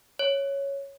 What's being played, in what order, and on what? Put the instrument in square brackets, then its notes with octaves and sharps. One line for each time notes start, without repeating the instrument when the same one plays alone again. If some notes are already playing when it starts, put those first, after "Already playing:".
[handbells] C#5